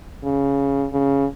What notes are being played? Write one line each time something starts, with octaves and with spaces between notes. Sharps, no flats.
C#3
C#3